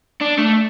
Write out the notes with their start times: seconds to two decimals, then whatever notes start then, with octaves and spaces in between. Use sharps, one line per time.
0.21 D4
0.38 A3